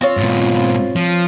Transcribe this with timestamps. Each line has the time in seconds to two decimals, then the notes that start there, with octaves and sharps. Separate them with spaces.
0.01 C4 F4 C#5
0.17 G#2 B2
0.96 F3